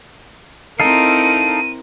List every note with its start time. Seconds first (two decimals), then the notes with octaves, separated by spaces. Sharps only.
0.80 C4 D#4 E4 A4 A#4 F5 D#7